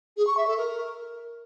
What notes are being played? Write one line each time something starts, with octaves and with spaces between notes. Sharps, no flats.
G#4
C#6
E5
A4
A#4